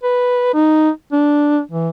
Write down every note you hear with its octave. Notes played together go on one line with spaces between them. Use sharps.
B4
D#4
D4
E3